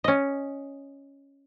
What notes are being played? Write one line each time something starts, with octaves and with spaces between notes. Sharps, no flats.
C#4 D#5